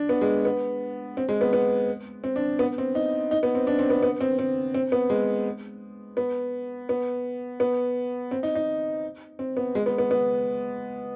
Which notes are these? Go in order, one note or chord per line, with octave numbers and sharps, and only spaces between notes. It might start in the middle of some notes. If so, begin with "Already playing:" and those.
Already playing: D4
B3
G#3
B3
C4
G#3
B3
B3
C4
D4
B3
C4
D#4
D#4
B3
C4
D4
C4
B3
B3
C4
C4
C4
B3
G#3
B3
B3
B3
C4
D#4
D#4
C4
B3
G#3
B3
B3
B3